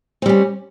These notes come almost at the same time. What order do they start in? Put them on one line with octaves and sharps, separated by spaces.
C4 G3 C#4